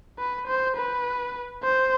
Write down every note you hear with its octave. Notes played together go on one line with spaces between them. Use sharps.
B4
C5
B4
C5